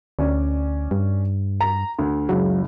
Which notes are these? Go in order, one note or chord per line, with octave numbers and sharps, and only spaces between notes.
D2 C#4 D5
G2
A#5
D2
F#1 C#2 F#3